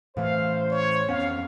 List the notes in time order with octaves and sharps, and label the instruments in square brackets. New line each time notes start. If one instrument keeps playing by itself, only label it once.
[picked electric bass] A2 E3 A3 [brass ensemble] C5 [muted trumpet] F5
[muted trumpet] C#5
[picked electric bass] F2 B3 C#4 [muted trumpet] F5